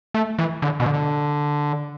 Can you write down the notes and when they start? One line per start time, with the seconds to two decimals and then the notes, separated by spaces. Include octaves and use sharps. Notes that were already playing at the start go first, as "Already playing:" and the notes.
0.14 A3
0.39 E3
0.62 D3
0.80 B2
0.86 D3